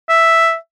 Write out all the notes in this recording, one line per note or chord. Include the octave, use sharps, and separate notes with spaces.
E5